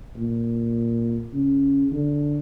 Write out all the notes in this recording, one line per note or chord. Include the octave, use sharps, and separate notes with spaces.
A#2
C#3
D3